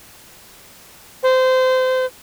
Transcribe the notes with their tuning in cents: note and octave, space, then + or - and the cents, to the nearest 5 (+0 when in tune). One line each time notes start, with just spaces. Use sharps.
C5 -25